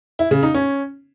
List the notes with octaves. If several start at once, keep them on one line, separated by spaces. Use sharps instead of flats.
E4
C#3
D#4
C#4